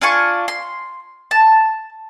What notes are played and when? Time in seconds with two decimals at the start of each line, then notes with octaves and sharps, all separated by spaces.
0.01 D4 F4 G#5 C#6
0.48 C6
1.31 A5